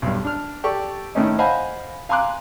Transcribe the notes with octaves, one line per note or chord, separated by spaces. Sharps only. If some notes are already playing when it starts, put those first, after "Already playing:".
B1 G2
D4 F6
G4 A4 D5 C#6
A2 D#3 C#4 D#4
C5 D#5 F5 F#5 G#5 B5
F5 G#5 A#5 C6 D6 F#6